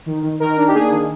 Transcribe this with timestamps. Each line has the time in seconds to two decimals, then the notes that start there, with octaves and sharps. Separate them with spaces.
0.06 D#3
0.23 D#3
0.40 D#3 A#4
0.57 D4
0.67 G4
0.74 A#3 G#4
0.91 D#3